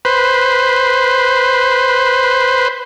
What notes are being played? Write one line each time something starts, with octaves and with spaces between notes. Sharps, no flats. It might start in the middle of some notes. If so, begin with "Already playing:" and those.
B4 C5